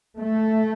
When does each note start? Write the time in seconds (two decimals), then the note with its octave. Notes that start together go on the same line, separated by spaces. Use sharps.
0.18 A3